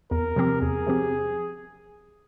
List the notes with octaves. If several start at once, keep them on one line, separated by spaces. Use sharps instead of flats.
E2 A#4
C3 F3 C4 G4
E2 G#4
C3 F3 C4 G4